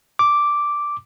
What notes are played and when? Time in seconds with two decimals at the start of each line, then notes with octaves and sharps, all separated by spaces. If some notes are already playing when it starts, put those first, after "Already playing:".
0.19 D6